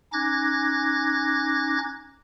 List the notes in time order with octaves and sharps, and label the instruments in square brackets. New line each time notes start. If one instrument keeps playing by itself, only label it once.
[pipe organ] C#4 D#4 D6 F#6 G#6 A#6